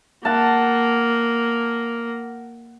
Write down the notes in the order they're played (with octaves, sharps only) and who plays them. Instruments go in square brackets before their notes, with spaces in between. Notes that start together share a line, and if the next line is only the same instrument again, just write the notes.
[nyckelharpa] A#3 [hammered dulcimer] F#5 A5